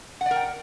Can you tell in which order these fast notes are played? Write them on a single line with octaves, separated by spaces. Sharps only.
F#5 D5 A#4 G5